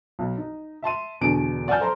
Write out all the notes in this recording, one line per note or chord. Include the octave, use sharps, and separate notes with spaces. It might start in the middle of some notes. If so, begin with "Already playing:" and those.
B1
D#4
E5 A5 C6 D#7
E2 B2 D3 D7
D5 F#5 G#5 A5 F6 G6
A4 C5 A#5 C6